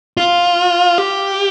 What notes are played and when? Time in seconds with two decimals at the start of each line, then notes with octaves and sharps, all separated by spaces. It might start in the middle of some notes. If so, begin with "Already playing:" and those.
0.17 F4
0.98 G4